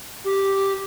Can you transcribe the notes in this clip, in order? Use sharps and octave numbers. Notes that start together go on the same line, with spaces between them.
G4